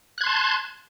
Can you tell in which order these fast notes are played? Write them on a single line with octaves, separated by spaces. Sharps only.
F#6 G#6 C6 A5